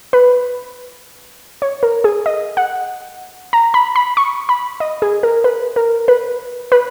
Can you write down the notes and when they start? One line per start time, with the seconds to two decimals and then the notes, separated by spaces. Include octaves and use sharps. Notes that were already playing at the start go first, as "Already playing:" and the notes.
0.13 B4
1.62 C#5
1.83 A#4
2.04 G#4
2.26 D#5
2.57 F#5
3.53 A#5
3.74 B5
3.96 B5
4.17 C#6
4.49 B5
4.80 D#5
5.02 G#4
5.23 A#4
5.44 B4
5.76 A#4
6.08 B4
6.72 B4